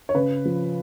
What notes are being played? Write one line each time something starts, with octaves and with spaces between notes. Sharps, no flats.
C#5
C#3 B4
F3